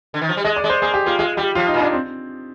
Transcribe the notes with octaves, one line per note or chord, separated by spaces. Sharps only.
D3
D#3
F3
G3
G#3 D#5
D5
G#3
C5
A#3 G#4
G4
A#3 F4
G#3 F4
G3 G4
F3 F4
D#4
A#2
D4
C4